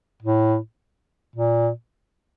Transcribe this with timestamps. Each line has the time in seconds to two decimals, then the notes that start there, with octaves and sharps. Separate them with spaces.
0.22 A2
1.36 A#2